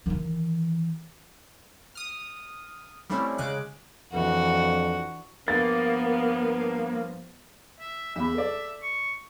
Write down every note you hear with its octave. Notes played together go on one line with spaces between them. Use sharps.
D#3 E3
D#6 F6
G3 A3 C4 C#4 E4
C#3 G#3 D6 F#6
F2 E3 D4 F#4
G2 F3 A#3 B3 A6
E5
E2 E5 B5
A4 D5
C#6